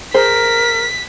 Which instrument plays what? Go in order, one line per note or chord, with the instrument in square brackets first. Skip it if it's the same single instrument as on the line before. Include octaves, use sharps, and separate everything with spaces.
[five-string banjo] G#4 C5 [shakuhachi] A#4 [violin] B6